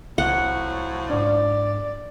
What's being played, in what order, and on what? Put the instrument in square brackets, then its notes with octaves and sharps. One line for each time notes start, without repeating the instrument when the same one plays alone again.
[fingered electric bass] C2 [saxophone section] A2 F3 F#3 [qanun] F#5
[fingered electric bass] G#2 D4 [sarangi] D5